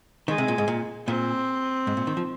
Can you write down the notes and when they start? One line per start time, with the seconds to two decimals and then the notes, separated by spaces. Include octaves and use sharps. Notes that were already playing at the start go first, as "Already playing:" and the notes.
0.28 D#3 G#3
0.38 C3
0.48 A#2
0.58 G#2
0.68 A#2
1.07 A#2 C4
1.87 G#2
1.97 A#2
2.07 D#3
2.17 F3